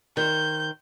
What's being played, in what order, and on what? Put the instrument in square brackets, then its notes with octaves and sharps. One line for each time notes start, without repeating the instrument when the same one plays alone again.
[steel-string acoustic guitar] D#3 C5 [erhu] G6